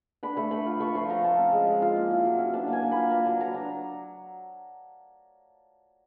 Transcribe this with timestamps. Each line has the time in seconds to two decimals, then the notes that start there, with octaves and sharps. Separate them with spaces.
0.23 D4 B5
0.37 A3 B5
0.51 A3 B5
0.66 F4
0.80 A3 C#6
0.95 F3 C6
1.09 F3 A#5
1.24 C4 A5
1.39 C#4
1.52 G#3
1.67 G#3
1.82 F4
1.96 A#3
2.11 E4
2.25 F#3
2.39 C#4
2.54 D4 A5
2.68 A#3
2.73 G#5
2.82 A#3
2.91 F4 B5
3.11 A#3 A#5
3.25 F#3 A5
3.40 F#3 A#5
3.54 D4 A#5